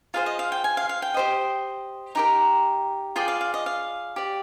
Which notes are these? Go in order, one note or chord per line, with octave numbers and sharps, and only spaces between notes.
F4 G#4 C5 F5
D#5
F5
G5
G#5
F5
F5
G5
G4 C5 D#5
D#4 G4 A#4 A#5
F4 G#4 D5 G5
F5
F5
D#5
F5
G4 D5